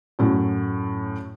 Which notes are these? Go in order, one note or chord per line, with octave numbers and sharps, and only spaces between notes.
F#2 A2 F#3